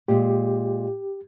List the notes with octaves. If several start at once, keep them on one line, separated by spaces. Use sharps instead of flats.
A#2 G#3 G4